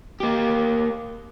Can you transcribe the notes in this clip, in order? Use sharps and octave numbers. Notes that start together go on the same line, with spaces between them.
A#3 G4